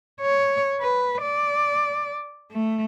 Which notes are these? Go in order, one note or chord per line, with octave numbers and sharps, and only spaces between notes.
C#5
B4
D5
A3